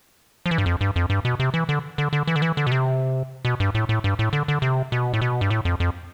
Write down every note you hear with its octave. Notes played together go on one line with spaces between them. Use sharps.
F3
E3
G2
F2
G2
F2
G2
B2
C3
E3
D3
D3
D3
E3
D3
E3
D3
B2
C3
B2
G2
A2
A2
G2
A2
D3
D3
C3
B2
A2
B2
G2
A2
F2
F2